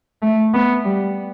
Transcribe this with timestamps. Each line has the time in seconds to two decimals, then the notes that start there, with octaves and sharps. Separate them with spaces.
0.22 A3
0.54 B3
0.85 G3